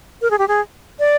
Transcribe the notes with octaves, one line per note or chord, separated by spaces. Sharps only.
A#4
G#4
G4
G#4
D5